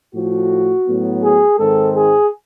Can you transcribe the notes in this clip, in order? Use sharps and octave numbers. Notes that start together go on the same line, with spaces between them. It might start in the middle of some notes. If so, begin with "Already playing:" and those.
A2 F3 A3 F#4
A2 F#3 B3
G#4
G#2 D#3 G#3 C4 A4
G#4